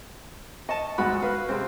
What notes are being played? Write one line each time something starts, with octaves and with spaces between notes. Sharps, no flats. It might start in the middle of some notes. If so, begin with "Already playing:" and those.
D#5 A5 C#6
D2 G#2 F#4 B5
B4 F5
C3 G#3 C4